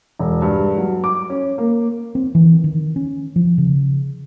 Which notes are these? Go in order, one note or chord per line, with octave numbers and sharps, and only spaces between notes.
E1
G2
F#3
D6
C#4
A#3
C4
E3
D#3
C#4
F3
C#3